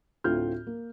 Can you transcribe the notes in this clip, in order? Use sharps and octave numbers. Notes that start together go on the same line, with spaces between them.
D2 A2 C4 F4 F6 G6
A#3